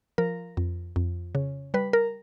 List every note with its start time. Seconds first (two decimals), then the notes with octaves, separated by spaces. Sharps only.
0.18 F3 A#4
0.57 F2
0.96 F2
1.35 C#3
1.74 G3 B4
1.93 A#4